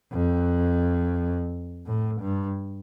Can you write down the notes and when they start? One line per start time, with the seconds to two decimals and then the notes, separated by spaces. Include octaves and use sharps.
0.12 F2
1.86 A2
2.21 G2